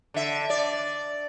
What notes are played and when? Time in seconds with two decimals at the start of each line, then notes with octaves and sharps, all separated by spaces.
0.14 D3 E5
0.50 D5